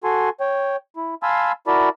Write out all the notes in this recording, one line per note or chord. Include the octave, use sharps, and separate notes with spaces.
F#4 A4 G#5 C6
C#5 G5
E4
F5 G#5 A5 B5 C6 E6
E4 F#4 A#4 D5 A5 B5